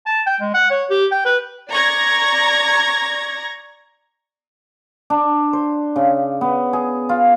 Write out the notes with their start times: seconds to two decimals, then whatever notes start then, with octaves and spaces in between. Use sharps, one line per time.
0.06 A5
0.26 G5
0.41 G#3
0.54 F#5
0.70 C#5
0.90 G4
1.11 G5
1.25 B4
1.70 D5 A#5 C#6 G#6 A#6
5.10 D4
5.53 C5
5.96 C#3
6.41 B3
6.73 G#4
7.09 F4